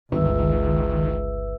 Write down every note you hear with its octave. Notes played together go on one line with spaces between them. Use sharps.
G1 C#2 D#3 B4 E5 E6